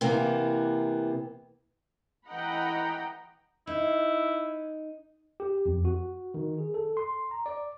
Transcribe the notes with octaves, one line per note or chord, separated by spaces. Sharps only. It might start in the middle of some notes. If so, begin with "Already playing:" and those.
C3 E3 A#3 B3
E3 D#5 F#5 G5 A#5 B5
D#4 E4
G4
F2
F#4
D#3
G#4
A4
C6
A#5
D5